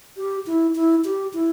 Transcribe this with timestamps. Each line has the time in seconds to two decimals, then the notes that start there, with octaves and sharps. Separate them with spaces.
0.17 G4
0.46 E4
0.75 E4
1.04 G4
1.33 E4